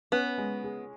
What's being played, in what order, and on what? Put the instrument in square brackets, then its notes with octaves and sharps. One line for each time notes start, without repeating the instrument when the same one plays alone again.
[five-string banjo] B3 [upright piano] C#4
[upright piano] G#3
G#4